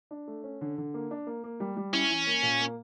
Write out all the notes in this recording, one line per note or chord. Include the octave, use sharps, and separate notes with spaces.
D4
A3
C#4
D3
D3
A#3
D4
A#3
A#3
G3
G3
C#4 E4
E3
A#3
A#2
A#3